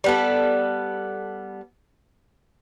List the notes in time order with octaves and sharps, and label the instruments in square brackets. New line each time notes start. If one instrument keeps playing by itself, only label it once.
[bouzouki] G3 B3 A4